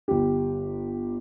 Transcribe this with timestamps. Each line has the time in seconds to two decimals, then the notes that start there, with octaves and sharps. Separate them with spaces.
0.08 G1 G4